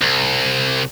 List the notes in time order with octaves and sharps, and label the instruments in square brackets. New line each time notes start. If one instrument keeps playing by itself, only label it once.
[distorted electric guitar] C2